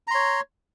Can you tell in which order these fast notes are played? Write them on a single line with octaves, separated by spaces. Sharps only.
A#5 C6 C#5